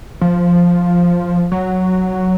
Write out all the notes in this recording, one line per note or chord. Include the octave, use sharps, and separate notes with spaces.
F3
F#3